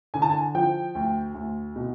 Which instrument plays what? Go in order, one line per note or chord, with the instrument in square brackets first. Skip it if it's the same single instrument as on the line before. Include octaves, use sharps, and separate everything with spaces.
[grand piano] D3 G#5
A5
G#5
F3 G5
D2
D2
B2